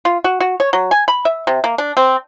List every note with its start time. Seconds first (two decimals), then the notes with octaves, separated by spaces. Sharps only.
0.05 F4
0.24 F#4
0.40 F#4
0.60 C#5
0.73 F#3
0.91 G#5
1.08 B5
1.25 E5
1.47 C3
1.64 A#3
1.78 D4
1.97 C4